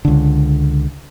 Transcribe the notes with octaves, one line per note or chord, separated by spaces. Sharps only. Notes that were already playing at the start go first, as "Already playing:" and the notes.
C#2 D3